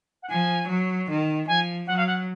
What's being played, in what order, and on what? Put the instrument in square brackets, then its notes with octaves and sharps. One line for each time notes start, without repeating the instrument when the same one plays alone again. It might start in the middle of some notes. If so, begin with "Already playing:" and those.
[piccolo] F#5
[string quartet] F3 [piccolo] G#5
[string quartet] F#3
D#3
[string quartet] F3 [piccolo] G#5
[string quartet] F#3 [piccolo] F#5
[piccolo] F5
F#5